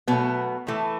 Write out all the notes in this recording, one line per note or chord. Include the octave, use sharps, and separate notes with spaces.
B2 F#3 A3 B3
A2 E3 A3